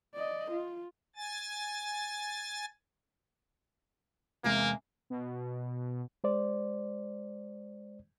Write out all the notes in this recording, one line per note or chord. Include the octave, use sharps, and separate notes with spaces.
D5 D#5
F4
G#5 A6
E2 C3 G#3 A#3
B2
G#3 C5 D5